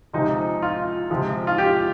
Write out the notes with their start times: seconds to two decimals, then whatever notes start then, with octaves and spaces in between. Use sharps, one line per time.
0.13 C3 F3 G#3 D#4
0.62 F4
1.10 C3 F3 G#3
1.47 F4
1.58 G4